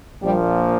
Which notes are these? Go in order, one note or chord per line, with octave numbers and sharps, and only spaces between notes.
A#1 A#2 F3 G3